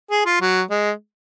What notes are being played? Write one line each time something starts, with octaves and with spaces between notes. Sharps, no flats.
G#4
F4
F#3
G#3